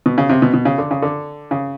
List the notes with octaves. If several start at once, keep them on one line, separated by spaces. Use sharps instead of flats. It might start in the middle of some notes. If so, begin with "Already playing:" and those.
B2
C#3
C3
B2
B2
C#3
D3
C#3
D3
C#3